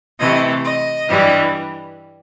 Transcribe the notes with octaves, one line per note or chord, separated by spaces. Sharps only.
C3 E3 A3 D#5
D#5
G2 E3 G3